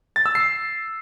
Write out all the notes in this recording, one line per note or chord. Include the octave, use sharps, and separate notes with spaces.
A6
E6
C7